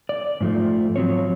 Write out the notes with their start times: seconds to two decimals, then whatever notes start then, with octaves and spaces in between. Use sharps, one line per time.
0.09 D5
0.41 G#2 F3 A3
0.96 F3 F#3 C4 C#5